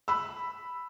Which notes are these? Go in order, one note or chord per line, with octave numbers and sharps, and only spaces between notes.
B5 E6